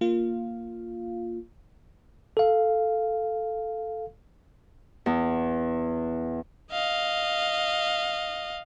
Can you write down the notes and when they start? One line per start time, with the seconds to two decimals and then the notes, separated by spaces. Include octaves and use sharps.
0.01 A#3 F4 F5
2.37 A4 F5
5.06 E2
6.71 D#5 F5